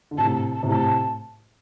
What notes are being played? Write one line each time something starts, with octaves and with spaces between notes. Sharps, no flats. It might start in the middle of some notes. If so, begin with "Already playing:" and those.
D3
A2 C3 A5
A5
A5
A2 C3
A5